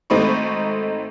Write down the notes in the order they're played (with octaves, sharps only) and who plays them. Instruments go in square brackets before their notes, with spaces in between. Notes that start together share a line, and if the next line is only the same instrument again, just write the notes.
[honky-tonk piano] G#1 A3 C4 D#4 B5 C#6